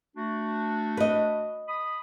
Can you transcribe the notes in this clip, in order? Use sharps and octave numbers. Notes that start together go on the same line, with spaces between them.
A3 D4 F#4
B4 D#5
B5 D#6